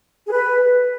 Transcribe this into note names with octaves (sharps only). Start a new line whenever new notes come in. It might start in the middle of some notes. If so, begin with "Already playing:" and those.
G#4
B4